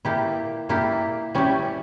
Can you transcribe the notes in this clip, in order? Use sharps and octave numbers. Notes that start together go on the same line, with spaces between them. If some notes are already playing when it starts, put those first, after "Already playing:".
A#2 A#3 E4 G4
A#2 A#3 E4 G4
G3 C#4 E4 G4